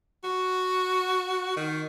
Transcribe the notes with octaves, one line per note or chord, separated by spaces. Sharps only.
F#4
D#3